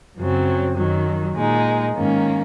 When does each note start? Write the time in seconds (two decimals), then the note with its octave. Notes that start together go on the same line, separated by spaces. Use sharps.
0.17 F#2 C#3 F#3 C4
0.76 F#2 D#3 F#3
1.36 A#2 G#3 D#4
1.95 G#2 D#3 A#3 C#4